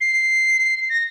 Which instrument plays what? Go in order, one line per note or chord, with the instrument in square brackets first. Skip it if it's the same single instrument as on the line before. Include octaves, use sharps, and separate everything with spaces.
[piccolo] C7
A#6